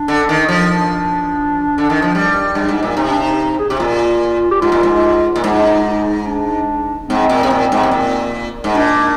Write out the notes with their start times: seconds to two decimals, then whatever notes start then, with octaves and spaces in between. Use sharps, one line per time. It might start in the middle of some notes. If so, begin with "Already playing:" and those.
Already playing: D4
0.08 D3
0.29 D#3
0.48 F3 D4
1.78 D3
1.90 D#3
2.02 F3
2.15 G3
2.55 G2
2.68 G#2
2.83 A#2
2.96 C3 D#4
3.09 D4
3.22 D#4
3.59 G#4
3.69 C3 G4
3.79 A#2 F4
4.51 G4
4.61 G#2 F4
4.72 A#2
4.83 G#2
5.36 A#2
5.44 G#2 F4
5.51 D#4
5.58 D4
5.66 D#4
6.27 D4
7.09 G#2 C4
7.29 A#2
7.43 C3
7.50 A#2
7.72 G#2
7.83 C3
7.91 A#2
8.64 G#2
8.75 A#2 D4